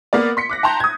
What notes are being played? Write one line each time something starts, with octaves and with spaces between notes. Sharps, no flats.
A#3 B3 A#4 D5
C6 B6 C#7
D6 F#6 A#6
G5 A5 A#5 C6 G6
D#6 G#6